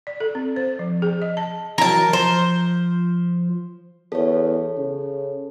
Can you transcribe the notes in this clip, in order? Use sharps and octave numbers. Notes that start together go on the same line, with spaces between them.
D5
A4
C4
C5
F3
G#4
D#5
A5
E3 F#3 A#4 A5
F3 C5
E2 A4 C#5
C#3